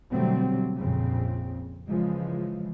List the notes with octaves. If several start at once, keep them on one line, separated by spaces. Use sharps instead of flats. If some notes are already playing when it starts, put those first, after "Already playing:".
B2 D3 F#3 G3 A3 C4
A#1 F2 C#3 C4
C#3 E3 F3 G#3